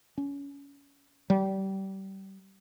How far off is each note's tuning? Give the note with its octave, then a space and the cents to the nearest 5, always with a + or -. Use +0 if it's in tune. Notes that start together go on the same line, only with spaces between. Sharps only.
C#4 +25
G3 -25